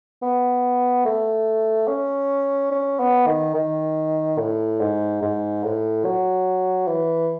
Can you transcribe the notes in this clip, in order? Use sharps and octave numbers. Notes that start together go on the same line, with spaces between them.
B3
A3
C#4
C#4
B3
D#3
D#3
A2
G#2
G#2
A2
F#3
E3